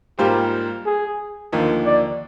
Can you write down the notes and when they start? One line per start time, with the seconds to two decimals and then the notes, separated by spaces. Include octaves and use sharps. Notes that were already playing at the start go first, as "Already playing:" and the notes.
0.18 G#2 G3 A#3 F4 G4 C5
0.86 G#4
1.52 D#2 D3 F3 A#3 D#4
1.86 D5